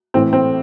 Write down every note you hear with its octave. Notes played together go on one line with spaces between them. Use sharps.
A2 E3 C4
C4